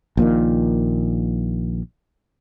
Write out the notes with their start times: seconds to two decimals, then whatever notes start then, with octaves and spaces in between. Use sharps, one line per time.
0.17 A#1 A#2 D#3